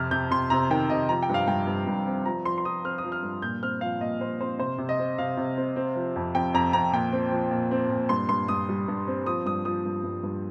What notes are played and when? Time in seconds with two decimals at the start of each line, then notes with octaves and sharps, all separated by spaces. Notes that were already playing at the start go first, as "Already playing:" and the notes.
Already playing: F2 C3 F6
0.11 C3 G6
0.31 C3 C6
0.50 C3 A#5
0.70 D#3 G5
0.90 C3 D#5
1.09 F3 A#5
1.23 G5
1.29 G2 F5
1.48 G2 G5
1.67 G2
1.87 G2
2.07 C4
2.26 F3 A#5
2.45 F3 C6
2.58 C6
2.65 F3 D#6
2.85 C4 F6
2.98 D#6
3.04 F3
3.12 F6
3.23 G2
3.42 A#2 G6
3.62 C4 F6
3.81 F3 F5
4.01 A#2 D#5
4.21 A#2 C5
4.41 C4 C5
4.59 C3 C5
4.78 C3
4.89 D#5
4.99 C4
5.18 C3 F5
5.37 C3
5.57 C4
5.76 C4
5.96 F3
6.16 F2
6.35 F2 G5
6.54 F2 A#5
6.73 F2 A#5
6.92 A#2 G5
7.13 C4
7.31 F3
7.51 A#2
7.71 C4
7.90 A#2
8.09 G2 C6
8.29 G2 C6
8.48 G2 D#6
8.69 G3
8.88 G2
9.08 C4
9.26 F3 D#6
9.45 G2 D#6
9.65 F3 D#6
9.85 G2
10.04 G2
10.23 G2